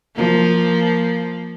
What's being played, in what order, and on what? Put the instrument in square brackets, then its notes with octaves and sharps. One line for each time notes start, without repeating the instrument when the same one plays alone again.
[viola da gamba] F3 A#3